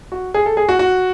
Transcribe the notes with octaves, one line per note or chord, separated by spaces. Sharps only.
F#4
G#4
A4
G#4
F#4
F#4